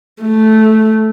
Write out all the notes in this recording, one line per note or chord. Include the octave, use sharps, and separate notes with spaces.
A3